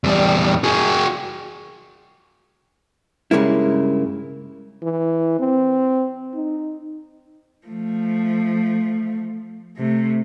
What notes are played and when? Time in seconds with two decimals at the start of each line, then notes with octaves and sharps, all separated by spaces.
0.04 E2 G3
0.64 F#4 G#4
3.31 G2 C#3 G#3 A#3 E4
4.82 E3
5.39 C4
6.34 D#4
7.67 F3 A3
9.77 C3 A3